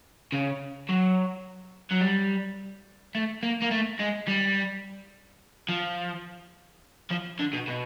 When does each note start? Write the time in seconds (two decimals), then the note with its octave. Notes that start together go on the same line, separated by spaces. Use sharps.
0.32 C#3
0.89 F#3
1.91 F#3
2.01 G3
3.15 A3
3.43 A#3
3.62 A#3
3.71 A3
4.00 G#3
4.28 G3
5.69 F3
7.10 F3
7.39 D3
7.53 B2
7.68 B2